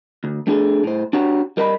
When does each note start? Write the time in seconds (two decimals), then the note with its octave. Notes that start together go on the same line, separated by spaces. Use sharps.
0.24 D2
0.47 A3 D4 G#4 A4
0.84 A2 C5
1.13 D4 F#4 G4 C#5 F#5 A#5
1.57 G3 A#4 D#5 A5 B5